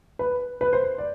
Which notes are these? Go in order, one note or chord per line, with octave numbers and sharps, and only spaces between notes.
B4
B4
C5
D5